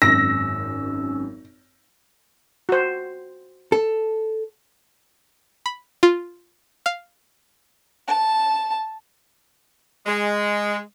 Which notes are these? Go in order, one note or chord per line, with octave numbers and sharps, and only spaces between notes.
G#1 F#2 E6 A#6
F#4 C5
A4
B5
F4
F5
A5
G#3